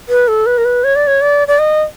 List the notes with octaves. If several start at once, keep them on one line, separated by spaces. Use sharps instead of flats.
B4
A4
B4
A#4
B4
C#5
D5
C#5
D5
D5
D#5